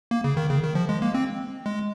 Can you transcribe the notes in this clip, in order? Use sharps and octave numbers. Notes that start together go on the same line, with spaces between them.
A#3
C#3
D#3
C#3
D#3
F3
G#3
A#3
C4
G#3